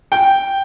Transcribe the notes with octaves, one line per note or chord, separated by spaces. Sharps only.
G5